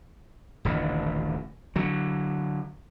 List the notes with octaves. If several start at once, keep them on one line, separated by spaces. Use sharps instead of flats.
D#1 A1 D3
D3 F#3